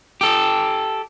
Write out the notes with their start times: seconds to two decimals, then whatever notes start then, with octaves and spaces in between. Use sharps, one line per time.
0.21 G4 A4